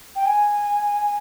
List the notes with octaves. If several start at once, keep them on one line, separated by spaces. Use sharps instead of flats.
G5
G#5